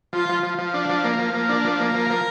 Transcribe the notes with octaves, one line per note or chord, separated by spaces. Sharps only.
F3 F4
F3
F3
F3
D4
F3
A#3
F3
A#3
D4
F3
A#3
F3 A#4
F3